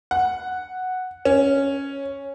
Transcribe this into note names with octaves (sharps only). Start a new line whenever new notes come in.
F#5
C#4